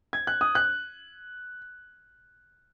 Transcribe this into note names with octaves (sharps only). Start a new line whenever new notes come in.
G#6
F#6
D#6
F#6